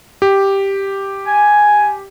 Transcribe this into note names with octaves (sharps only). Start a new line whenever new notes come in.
G4
G#5